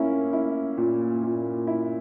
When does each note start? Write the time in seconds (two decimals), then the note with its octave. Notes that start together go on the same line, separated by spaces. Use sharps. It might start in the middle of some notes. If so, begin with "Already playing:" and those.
Already playing: A#3 C#4 E4
0.33 E4
0.78 A#2
1.23 A#2
1.67 E4